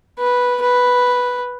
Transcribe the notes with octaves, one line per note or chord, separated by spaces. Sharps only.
B4
B4